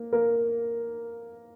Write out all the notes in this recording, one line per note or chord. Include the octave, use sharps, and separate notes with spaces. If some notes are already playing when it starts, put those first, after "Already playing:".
Already playing: A#3 A#4
A#3 A#4